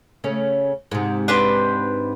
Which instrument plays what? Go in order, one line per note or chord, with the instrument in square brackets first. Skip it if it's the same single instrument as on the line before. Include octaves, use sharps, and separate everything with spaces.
[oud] C#3 A3 C#4
G#2 C3
[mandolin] D4 B4 C5